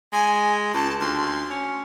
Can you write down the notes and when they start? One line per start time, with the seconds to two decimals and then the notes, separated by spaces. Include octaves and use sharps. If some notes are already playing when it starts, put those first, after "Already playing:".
0.13 G#3 G#5
0.74 C#2 A5
1.01 D2 C6
1.50 C#4